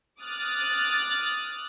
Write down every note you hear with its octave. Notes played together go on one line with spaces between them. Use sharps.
D6 D#6 F6 F#6 A6